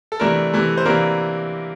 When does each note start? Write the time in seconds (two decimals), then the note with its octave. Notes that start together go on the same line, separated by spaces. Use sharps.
0.12 A4
0.20 C3 E3 A3 D4 A#4
0.54 C3 E3 A3
0.77 C5
0.85 C3 E3 A#3 D4 A#4